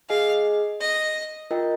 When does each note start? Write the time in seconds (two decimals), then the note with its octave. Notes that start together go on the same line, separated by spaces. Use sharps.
0.09 G#4 D#5 F5 G#5
0.81 D#5
1.51 F4 A#4 D#5 G5